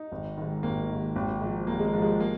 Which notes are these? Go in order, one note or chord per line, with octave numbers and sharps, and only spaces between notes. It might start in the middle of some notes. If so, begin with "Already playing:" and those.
Already playing: D#4
G#1
G#2 D#3
G#1 A#3
G#2 D#3
G#1
G#2 F3
G#1 A#3
G#3
A#3
G#2 F3
G#3
A#3